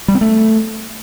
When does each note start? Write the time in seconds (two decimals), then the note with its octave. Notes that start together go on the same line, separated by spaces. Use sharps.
0.08 G3
0.15 C4
0.21 A3